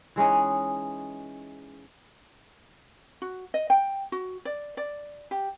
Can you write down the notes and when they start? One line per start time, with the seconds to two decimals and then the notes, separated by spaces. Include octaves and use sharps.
0.16 E3 G#3 C#4 D#4
3.22 F#4
3.54 D#5
3.70 G5
4.12 F#4
4.45 D5
4.77 D5
5.31 G4